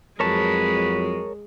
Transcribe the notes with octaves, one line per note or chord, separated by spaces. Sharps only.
F2 F#3 G#3 A#4 B4 C#5 A5